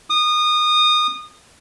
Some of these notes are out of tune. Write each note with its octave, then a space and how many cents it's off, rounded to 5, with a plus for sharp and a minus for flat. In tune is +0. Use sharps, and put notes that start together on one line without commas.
D#6 -25